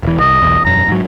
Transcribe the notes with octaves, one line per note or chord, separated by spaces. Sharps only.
E1 E3
C2 D#5
B1 E2
E1 F#2 A#5
G#2 F#3